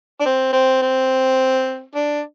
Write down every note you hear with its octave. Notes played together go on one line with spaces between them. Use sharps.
D4
C4
C4
C4
D4